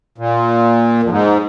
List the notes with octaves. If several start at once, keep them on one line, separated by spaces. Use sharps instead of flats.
A#2
F2
G#2